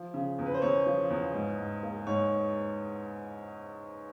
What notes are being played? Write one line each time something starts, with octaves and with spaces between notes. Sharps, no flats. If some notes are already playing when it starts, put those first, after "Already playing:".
Already playing: F3
C#3
E2
B4
C5
E2 C#5
F3
E2
G#2
G#2
A#3
G#2 C#5